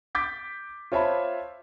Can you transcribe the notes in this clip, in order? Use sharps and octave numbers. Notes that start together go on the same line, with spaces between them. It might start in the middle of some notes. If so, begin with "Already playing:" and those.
D6 G6 A6 B6
F4 C5 C#5 E5 A5 B5